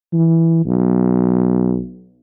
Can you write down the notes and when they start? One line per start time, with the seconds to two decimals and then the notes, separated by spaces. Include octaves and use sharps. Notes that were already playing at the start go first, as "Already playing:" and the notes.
0.13 E3
0.65 B1